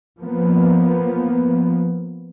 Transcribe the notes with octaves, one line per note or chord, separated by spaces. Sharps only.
F3 A#3 B3